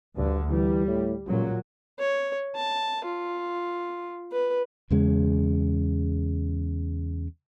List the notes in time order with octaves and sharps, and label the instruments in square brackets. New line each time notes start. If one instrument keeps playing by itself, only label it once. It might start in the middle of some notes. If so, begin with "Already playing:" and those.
[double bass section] D2 D3 [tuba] G2
[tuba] E3 [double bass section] G3
[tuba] A2
[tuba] C#2 [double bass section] A#2 F#3
[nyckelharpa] C#5
A5
F4
B4
[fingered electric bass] E2 C#3 G#3